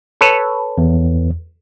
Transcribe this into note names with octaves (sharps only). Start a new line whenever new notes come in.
A4 B4 C#5
E2